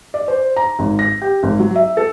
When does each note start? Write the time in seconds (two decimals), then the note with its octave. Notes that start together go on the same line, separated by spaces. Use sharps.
0.14 D5
0.28 C5
0.56 A#5
0.79 G#1
0.99 A#6
1.22 G4
1.43 G#1
1.59 F#3
1.76 E5
1.97 A4